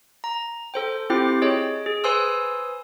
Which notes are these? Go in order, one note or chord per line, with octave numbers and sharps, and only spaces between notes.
A#5
A4 C5 G5
C4 E4 F4 G4 C5 G5
G#4 C#5 D#5
G#4
B4 C5 G#5 C6 D#6 E6